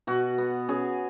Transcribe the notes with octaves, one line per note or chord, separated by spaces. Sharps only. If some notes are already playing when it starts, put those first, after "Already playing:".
B2 F#4
B3
C#4 G#4